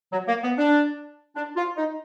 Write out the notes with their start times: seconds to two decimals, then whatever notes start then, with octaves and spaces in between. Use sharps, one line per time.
0.12 F#3
0.28 A#3
0.43 B3
0.58 D4
1.36 D4
1.57 F4
1.77 D#4